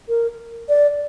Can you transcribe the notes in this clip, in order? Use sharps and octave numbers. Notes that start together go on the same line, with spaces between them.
A#4
D5